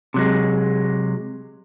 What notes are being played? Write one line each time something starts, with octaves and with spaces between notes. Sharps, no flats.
C3 F#3 G#3